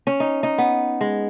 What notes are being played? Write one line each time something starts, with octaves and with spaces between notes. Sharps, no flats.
C#4
D#4
D#4
B3
G#3